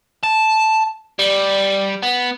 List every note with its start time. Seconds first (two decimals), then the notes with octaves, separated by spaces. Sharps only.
0.24 A5
1.19 G3
2.02 B3